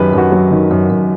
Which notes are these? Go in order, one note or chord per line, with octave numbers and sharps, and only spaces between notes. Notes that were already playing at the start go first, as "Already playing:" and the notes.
Already playing: F#2 D#3 G4 B4
F#2 F#4
F#3
D#3
F#2
F#2